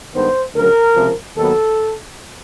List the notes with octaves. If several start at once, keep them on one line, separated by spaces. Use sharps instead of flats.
G2 D#3 G#3 B3 C5
D2 C#3 F#3 A#4
C#2 C3 F3
D#2 D#3 F#3 B3 A4